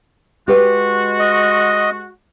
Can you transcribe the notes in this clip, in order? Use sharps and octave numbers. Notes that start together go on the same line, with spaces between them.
G#3 F#4 G4 B4 G5
D#5